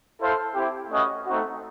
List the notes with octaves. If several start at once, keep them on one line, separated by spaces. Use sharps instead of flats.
E4 A4 C5 F5
C4 E4 G4
A3 C#4 F#4 B4 D#5
A3 C4 D#4 F#4